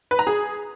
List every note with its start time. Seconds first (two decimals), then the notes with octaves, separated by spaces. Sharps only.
0.11 B4
0.19 A#5
0.27 G#4